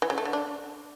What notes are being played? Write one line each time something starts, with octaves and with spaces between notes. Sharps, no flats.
E3
C#3
A3
D3
D4